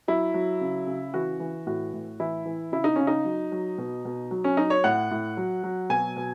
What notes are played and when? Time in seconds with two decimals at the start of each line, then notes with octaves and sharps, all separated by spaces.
0.08 F#3 E4
0.34 F#3
0.61 C#3
0.87 C#3
1.14 E3 F#4
1.40 E3
1.66 A2 F#4
1.93 A2
2.20 E3 E4
2.46 E3
2.72 C#3 E4
2.84 D#4
2.96 C#3 C#4
3.07 D#4
3.25 F#3
3.52 F#3
3.78 B2
4.05 B2
4.31 F#3
4.44 C#4
4.57 F#3 D#4
4.70 C#5
4.84 A2 F#5
5.11 A2
5.37 F#3
5.64 F#3
5.90 B2 G#5
6.16 B2